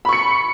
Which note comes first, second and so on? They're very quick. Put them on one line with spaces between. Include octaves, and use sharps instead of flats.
B5 C#6 C#7